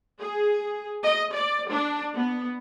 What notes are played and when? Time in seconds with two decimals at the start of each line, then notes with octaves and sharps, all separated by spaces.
0.20 G#4
1.04 D#5
1.32 D5
1.69 D4
2.14 B3